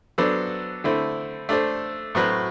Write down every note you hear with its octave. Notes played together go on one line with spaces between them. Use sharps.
F#3 B3 D4 A4 C5
D3 A3 C4 E4
A3 D4 A4 C5
A2 F#3 C4 F#4 B4